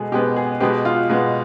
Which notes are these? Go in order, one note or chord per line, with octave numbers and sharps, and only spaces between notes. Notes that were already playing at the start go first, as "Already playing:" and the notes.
Already playing: B2 G#3 B3 G#4 A4
B2 G#3 B3 G4
G#4
B2 G#3 B3 G4
F4
B2 G#3 B3